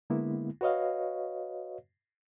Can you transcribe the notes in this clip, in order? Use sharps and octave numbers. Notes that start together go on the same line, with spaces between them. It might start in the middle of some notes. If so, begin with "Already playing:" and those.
D3 G#3 A#3 B3 E4
F#4 B4 C#5 D#5 F5